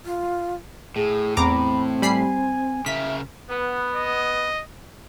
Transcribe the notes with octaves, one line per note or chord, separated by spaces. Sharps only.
F4
A2 G#4
E2 C4 A#5 B5 D6
G3 G#5 B5 C7
C#3 A#4 E5 B6
B3
D#5